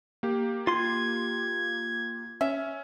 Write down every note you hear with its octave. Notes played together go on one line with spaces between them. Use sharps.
A#3 G4
F4 C6 G#6
C#4 E5